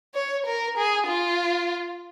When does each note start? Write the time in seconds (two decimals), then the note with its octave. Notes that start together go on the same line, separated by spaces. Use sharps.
0.15 C#5
0.46 A#4
0.77 G#4
1.07 F4